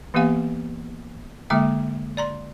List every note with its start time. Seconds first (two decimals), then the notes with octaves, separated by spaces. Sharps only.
0.14 E3 A#3 B3 G4 F5 G#5
1.50 D3 G#3 A#3 E5 G5 D6
2.17 D5 A#5 C6